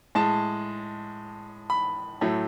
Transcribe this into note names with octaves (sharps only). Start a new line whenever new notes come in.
A2 G#3 A5
B5
A2 F#3 A3